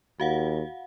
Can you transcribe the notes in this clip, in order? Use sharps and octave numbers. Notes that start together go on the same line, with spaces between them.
D#2 F#4 F5 F#5